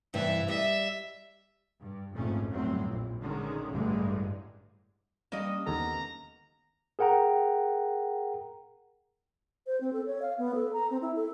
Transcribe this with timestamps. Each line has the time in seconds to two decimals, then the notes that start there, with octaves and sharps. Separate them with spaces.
0.14 G2 C3 E3 E5
0.48 G3 D#5 E5
1.80 G2
2.13 G#1 F2 A#2 A3 C#4
2.50 G1 A2 F#3 C4
2.83 A#1
3.20 D3 D#3 G#3 C#4
3.68 A1 G2 D3 G#3
5.32 G3 A#3 C#4 D4 D#5
5.67 D#2 B3 C#4 A4 A#5
6.99 G#4 A#4 F#5 G5 A#5
9.67 C5
9.81 C4
9.93 A4
10.06 C#5
10.22 F5
10.38 B3
10.55 A4
10.73 A#5
10.90 C4
11.02 E4
11.16 A4